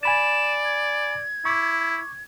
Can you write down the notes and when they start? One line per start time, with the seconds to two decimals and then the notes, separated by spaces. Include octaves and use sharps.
0.03 D5 G#5 B5 A6 E7
0.65 G#6
1.45 E4 C#6 D6